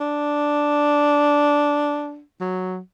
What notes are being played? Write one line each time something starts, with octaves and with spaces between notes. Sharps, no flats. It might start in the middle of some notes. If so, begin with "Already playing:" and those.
D4
F#3